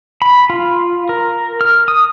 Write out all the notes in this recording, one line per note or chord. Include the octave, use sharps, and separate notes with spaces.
B5
F4
A#4
F6
D#6